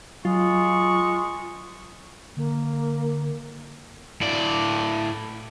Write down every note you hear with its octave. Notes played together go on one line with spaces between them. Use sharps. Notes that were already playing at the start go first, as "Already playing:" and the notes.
F#3 G#3 F4 C#6
D3 A#3
A2 D5